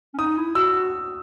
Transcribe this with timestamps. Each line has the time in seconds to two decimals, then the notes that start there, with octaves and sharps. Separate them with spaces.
0.14 C#4
0.18 D#4 D#6
0.37 E4
0.55 F#4 E6